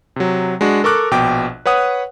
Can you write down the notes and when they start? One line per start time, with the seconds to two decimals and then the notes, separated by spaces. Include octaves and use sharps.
0.16 C3 F#3
0.61 G#3 D4 F#4
0.84 A4 A#4 C#6 D6 F#6
1.11 A#1 B2 G5 D6
1.66 B4 C#5 F#5 D#6